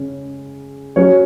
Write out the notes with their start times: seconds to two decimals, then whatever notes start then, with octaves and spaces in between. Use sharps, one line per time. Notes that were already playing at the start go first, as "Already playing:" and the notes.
Already playing: C#3 G#3 C#4
0.96 F#3 C#4 F#4 C#5